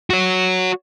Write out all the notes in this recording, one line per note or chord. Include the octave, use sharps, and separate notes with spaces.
F#4 C#5